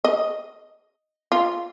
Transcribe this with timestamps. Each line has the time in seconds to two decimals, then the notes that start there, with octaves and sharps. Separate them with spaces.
0.04 D#5
1.32 F4